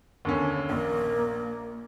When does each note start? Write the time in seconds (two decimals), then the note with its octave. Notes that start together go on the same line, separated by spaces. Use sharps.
0.25 D#2 D3 C#4
0.69 A#1 A#3